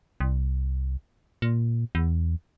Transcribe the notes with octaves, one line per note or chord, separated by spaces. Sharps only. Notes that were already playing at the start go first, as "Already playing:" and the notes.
C2
A#2
E2